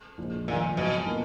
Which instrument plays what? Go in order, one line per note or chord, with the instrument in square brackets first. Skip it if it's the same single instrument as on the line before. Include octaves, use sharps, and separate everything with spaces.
[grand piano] A#1 A#2 G#3
[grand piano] F1 F2 D#3 [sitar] A#2
[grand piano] G#1 G#2 F#3 [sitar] B2
[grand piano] B2 A#3 F4